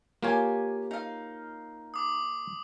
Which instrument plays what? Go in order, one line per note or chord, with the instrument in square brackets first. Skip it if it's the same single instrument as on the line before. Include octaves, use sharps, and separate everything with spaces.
[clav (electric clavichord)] A#3 F4 C#5 [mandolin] G4 G#5
[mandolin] D#4 F5
[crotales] D6 D#6